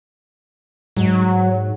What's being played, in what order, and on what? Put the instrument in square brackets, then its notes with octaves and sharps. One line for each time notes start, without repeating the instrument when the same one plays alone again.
[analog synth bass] G#2 [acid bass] F#3